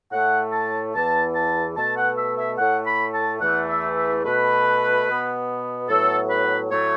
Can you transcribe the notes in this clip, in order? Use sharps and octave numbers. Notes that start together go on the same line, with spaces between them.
A2 A3 F#5
A5
E2 E3 B3 A5
A5
B2 A3 A5
F#5
E5
E5
A2 A3 F#5
B5
A5
E2 E3 A3 F#5
E5
E5
B2 A3 B4
B2 B3
A2 F#3 B3 A4
B4
A2 F#3 A3 C#5